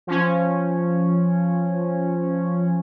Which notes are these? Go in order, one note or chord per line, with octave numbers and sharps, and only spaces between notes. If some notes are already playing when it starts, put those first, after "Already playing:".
F3 C#4